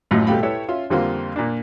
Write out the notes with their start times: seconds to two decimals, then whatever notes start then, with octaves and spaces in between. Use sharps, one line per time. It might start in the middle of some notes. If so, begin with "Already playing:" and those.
0.11 A1 F#2 A2 F4 D#5
0.27 C2 B2 A3 G4 F5 B5
0.42 E4 G4 A4 B4 C#5 E5
0.68 C#4 F4 E5
0.90 F2 D3 G3 A#3 C4 F4
1.36 A#2 A#3 D4